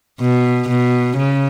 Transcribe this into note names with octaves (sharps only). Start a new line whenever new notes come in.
B2
B2
C#3